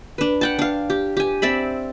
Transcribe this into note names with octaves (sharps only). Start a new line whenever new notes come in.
D4 B4
F#5 G5 A5
D4 F5
G4
G4 G#5
C4 D5 E5 B5